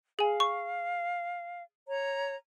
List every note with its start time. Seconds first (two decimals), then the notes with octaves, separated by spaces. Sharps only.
0.19 G#4 F5 G#5
0.40 C#6
1.87 C#5 A#5